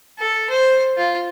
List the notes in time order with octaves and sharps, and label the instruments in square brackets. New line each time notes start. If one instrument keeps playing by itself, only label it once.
[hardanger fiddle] A4
C5
F4